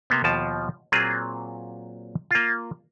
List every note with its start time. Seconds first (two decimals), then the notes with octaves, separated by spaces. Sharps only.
0.10 C3 A#3 B3
0.24 D#2 B2 F3 A5
0.92 A#2 F#3 A#3 C4 F4 G#4
2.31 A#3 F4